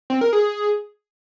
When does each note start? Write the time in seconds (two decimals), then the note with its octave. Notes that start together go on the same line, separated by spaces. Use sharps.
0.10 C4
0.21 A#4
0.33 G#4